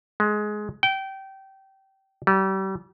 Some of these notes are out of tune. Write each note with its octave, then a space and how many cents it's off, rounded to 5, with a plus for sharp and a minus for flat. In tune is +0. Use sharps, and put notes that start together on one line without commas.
G#3 +15
G5 -20
G3 -35